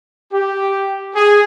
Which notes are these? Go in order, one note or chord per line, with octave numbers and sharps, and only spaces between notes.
G4
G#4